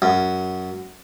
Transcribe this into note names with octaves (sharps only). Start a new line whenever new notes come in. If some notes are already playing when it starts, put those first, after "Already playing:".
F#2